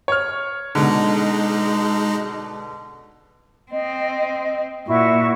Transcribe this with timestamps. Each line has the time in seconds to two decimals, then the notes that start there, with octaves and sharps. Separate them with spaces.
0.08 C#5 F6
0.75 B2 D3 G#3 D#4
3.72 C4 D#5
4.87 A#2 E4 F#4 C#6